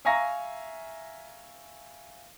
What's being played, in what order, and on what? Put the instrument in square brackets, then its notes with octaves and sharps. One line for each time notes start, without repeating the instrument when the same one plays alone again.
[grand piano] E5 F5 G#5 A#5 C#6 A#6